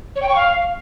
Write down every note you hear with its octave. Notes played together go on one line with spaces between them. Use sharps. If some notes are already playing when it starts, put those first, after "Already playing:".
C#5
G5
C#6
F5